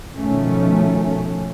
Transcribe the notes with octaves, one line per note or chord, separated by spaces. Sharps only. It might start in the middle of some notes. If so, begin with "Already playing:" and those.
B2 D#3 F3 A3 C#4